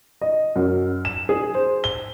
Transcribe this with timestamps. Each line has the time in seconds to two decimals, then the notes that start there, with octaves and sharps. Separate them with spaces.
0.21 D#5
0.56 F#2
1.05 E7
1.29 G#4
1.55 C5
1.84 G7